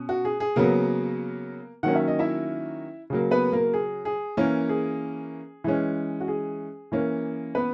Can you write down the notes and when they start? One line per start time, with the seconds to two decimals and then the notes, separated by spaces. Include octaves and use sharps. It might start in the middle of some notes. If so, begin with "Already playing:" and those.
Already playing: B2 C#4
0.09 F#4
0.25 G#4
0.40 G#4
0.56 C#3 F#3 A#3 B3 A#4
1.83 D#3 F#3 A#3 C#4 F#5
1.95 E5
2.08 D#5
2.19 E4 E5
3.10 C#3 F#3 A#3
3.31 B3 B4
3.52 A#3 A#4
3.74 G#4
4.05 G#4
4.37 E3 A#3 C#4 A#4
4.69 G#4
5.64 E3 G#3 C#4
6.21 F#4
6.28 G#4
6.92 E3 A#3 C#4
7.55 B3 B4